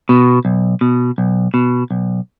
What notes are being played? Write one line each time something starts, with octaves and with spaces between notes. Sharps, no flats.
B2
B1
B2
B1
B2
B1